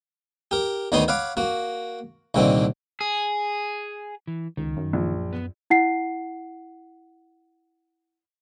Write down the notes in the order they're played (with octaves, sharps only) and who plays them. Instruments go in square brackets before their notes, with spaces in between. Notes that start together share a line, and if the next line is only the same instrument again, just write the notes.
[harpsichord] G4 A#4
D2 D#3 B3 D#4 C#5 C6
C#5 F5 F#5 B5 D6
A#3 F#4
C2 A#2 D3 D#3 C4
[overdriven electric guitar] G#4
[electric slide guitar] E3
[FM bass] C#2 [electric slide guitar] D#3
[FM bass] F#2
[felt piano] A#1
[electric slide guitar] B3
[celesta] E4 F#5 C7